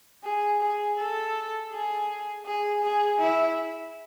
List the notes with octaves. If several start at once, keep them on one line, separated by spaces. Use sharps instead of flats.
G#4
G#4
A4
G#4
G#4
G#4
E4